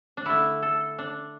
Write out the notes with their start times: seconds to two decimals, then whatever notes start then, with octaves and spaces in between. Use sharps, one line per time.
0.17 D4
0.25 D3 A3 E4
0.62 A4
0.99 D4